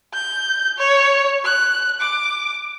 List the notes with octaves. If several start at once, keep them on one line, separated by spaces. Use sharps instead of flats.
G6
C#5
F#6
D6